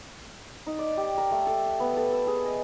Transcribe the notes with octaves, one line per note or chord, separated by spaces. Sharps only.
D#4
D5
G4
A#4
A3
A4
B3
A4
E6
G#4
D#5